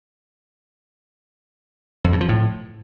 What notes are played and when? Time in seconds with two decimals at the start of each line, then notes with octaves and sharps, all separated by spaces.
2.04 F2
2.12 G2
2.21 F3
2.29 A2